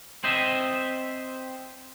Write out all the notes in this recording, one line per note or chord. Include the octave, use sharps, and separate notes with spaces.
C4 C5 D#5 E5